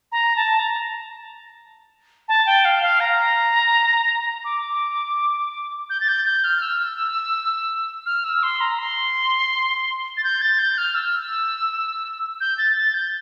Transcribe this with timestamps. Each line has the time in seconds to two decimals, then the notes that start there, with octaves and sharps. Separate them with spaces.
0.12 A#5
0.36 A5
0.59 A#5
2.28 A5
2.46 G5
2.65 F5
2.82 F5
3.00 A#5
4.45 D6
5.90 G6
6.00 A6
6.08 G6
6.25 G6
6.44 F6
6.62 E6
8.06 F6
8.24 E6
8.43 C6
8.61 A#5
8.79 C6
10.17 A6
10.24 G6
10.42 A6
10.59 G6
10.78 F6
10.95 E6
12.41 G6
12.58 A6
12.76 A6
12.94 G6